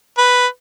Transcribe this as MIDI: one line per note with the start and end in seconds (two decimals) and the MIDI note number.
0.18 0.47 71